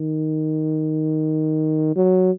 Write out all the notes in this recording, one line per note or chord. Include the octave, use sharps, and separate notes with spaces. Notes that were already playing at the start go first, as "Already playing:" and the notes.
Already playing: D#3
F#3